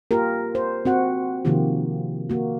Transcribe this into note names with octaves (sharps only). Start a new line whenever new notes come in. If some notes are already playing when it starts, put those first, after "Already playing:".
A#3 F4 G4 A#4
C5
C4 F#4 F#5
C3 D#3 F3 A#3 F4 G4
A#3 F#4